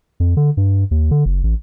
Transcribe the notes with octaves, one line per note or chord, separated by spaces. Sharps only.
F2
D3
G2
D#2
D3
F#1
A1